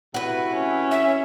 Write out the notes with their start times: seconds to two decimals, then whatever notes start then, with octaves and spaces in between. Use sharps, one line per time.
0.14 C3 A3 E4 F#4 B4
0.52 C#4
0.91 E5